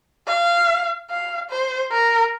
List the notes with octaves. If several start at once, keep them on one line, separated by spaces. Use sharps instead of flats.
F5
F5
C5
A#4